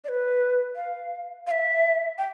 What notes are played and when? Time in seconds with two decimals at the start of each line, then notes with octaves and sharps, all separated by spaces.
0.04 D5
0.09 B4
0.76 F5
1.47 F5
1.51 E5
2.18 G5